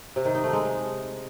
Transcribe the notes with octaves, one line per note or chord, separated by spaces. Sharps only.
C3
D#3
D#4
A3
G#3